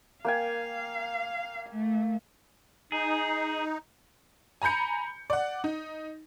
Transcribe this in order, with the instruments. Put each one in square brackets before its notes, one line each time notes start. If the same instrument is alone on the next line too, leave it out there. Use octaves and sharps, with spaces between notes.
[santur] A#3 G5 G#5 [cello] F5
[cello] A3
[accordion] D#4 [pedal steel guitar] G#4
[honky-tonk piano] G#5 A#5 B5 G6 C#7
D5 F#5
D#4